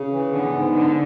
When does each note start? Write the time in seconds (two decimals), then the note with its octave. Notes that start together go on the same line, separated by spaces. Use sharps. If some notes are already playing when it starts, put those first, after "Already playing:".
Already playing: C#3
0.11 E3
0.32 D3 B3
0.51 G#2
0.73 D3 B3